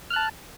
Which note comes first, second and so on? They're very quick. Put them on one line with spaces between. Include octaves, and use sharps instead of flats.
F6 F#6 A5